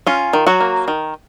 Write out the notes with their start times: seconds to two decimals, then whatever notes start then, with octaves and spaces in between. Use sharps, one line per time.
0.07 C#4 F4
0.33 D#3
0.47 F#3 F#4
0.60 A#3
0.88 D#3